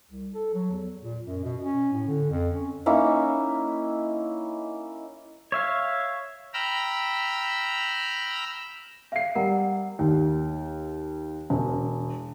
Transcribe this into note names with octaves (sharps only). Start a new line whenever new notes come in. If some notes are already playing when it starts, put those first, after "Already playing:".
C2
A4
F#3
E2
A#2
F#2
B2
C#4
A2
D3
F2
C#4
A#3 C#4 D#4 E4
C#5 E5 F5
G5 A#5 B5 E6 F6
E5 F5 C7
G3 A#4 F#5 A#5
D#2
E1